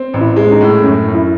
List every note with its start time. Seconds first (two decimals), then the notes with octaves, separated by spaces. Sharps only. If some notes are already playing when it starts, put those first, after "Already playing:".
Already playing: C4
0.14 A1
0.21 E4
0.36 G#3
0.48 C#4
0.52 D#4
0.61 A2
0.83 F#2 C#4
1.07 F#2
1.15 E4